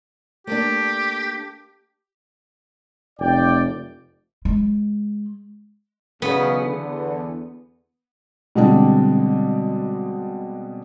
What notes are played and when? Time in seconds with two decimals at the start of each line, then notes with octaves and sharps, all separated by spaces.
0.47 A3 A#3 D4 G4
3.20 F1 D5 G5
4.45 G#3
6.22 B1 E2 C#3 B3
6.65 E2 D3
8.55 B2 D3 G3 G#3 C4 D4